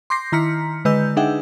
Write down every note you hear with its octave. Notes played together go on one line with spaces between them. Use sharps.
C6 D6 G6 A#6 C7
D#3 E4 A#5 F6 B6 C#7
D3 G#3 B4 D#5 E6 G6
D4 D#4 G#4 E5 F#5 G5